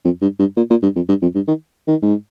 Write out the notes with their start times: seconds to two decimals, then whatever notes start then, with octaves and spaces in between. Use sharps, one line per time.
0.05 F2
0.22 G2
0.39 G2
0.57 A#2
0.70 A#2
0.83 G2
0.96 F2
1.09 G2
1.22 F2
1.35 G2
1.48 D#3
1.87 D#3
2.02 G#2